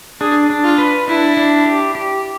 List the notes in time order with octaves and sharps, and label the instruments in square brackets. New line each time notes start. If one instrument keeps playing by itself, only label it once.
[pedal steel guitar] D4 [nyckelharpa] G#4
[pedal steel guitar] D4
[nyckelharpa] F4
[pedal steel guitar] B4
[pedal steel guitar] D4 [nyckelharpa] E4
[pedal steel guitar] D4
G4
G4